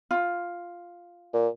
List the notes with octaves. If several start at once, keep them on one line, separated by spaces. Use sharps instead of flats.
F4
A#2